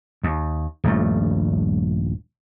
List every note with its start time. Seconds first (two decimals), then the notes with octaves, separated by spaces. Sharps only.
0.23 D#2
0.84 D#1 A#1 G2 A3